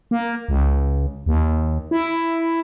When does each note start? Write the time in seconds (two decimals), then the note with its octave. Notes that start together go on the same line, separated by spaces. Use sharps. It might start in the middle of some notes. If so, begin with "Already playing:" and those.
0.11 A#3
0.49 C#2
1.26 D#2
1.91 E4